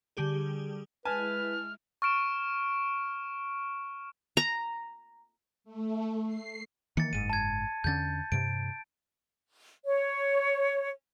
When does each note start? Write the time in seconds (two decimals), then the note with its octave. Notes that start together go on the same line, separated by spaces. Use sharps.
0.17 D3 G3 G4 G#4
1.05 G#3 E4 B4 G#5 A5 F6
2.02 C#6 F6 D7 E7
4.37 A#5
5.64 A3
6.26 C7
6.97 D#3 E3 A#3 A6 C#7
7.13 F#1 G#2 D#7
7.30 A5 G#6
7.84 E2 D3 C#4 G6 A6
8.32 G2 C3 D7
9.85 C#5